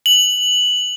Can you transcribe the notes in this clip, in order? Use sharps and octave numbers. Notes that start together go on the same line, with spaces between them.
F#7